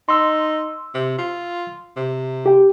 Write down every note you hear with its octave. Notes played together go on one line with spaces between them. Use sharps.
D#4 C6 E6
C3
F4
C3
G4 G5